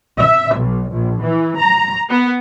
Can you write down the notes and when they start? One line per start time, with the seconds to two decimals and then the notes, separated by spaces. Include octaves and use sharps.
0.19 E5
0.57 B1
0.91 A#1
1.23 E3
1.58 A#5
2.09 B3